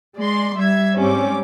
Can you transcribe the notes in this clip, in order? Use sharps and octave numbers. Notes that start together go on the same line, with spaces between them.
G#3 D5 C6
G3 E5 G#6
G#2 G3 C4 C#4 D6